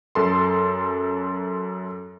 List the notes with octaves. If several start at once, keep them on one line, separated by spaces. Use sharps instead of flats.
F#2 A4 C6